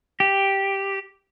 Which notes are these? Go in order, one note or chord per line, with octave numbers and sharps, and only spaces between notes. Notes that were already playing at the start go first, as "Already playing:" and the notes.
G4